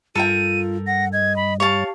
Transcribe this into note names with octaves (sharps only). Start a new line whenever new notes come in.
G2 F4 A4 A#4 G5 D#7
F#5 A#6
D#5 G#6
B5
G4 C#5 F5 A5